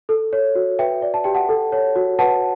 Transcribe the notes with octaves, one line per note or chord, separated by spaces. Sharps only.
A4
C#5
F#4
B4 E5 G5
D5
A5
G4 G5
F#5 A5
A4
C#5
F#4
B4 F#5 A5